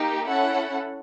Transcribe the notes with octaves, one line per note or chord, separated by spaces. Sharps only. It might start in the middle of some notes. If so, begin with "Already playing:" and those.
Already playing: A#3 D#4 G4
C#4 E4 A4 F#5